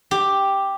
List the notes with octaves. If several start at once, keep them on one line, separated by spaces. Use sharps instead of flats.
G4